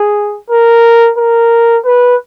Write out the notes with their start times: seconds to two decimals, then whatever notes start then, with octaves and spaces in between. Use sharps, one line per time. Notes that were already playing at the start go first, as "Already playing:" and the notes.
Already playing: G#4
0.50 A#4
1.18 A#4
1.85 B4